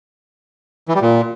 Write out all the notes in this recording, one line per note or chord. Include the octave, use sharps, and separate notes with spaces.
E3
G3
A#2